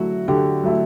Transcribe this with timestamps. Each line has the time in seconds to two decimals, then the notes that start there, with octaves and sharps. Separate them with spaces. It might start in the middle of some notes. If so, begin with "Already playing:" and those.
Already playing: D3 F#3 A3 E4 F#4
0.28 D3 G4
0.64 F#3 A3 E4